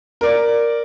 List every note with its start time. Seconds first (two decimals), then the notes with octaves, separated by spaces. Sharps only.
0.21 A#4 D5